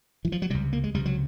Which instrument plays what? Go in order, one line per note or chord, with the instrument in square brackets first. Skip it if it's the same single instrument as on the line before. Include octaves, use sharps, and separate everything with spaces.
[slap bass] E3
F3
F#3
C#2 C3 G3
A#3
G#3
C#2 C3 G3
F#3